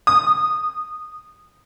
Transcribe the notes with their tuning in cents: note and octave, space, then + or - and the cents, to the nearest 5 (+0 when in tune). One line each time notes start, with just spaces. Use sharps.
D#6 -20